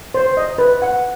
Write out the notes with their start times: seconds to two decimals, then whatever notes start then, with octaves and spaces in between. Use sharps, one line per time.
0.14 C5
0.37 D#5
0.58 B4
0.82 F#5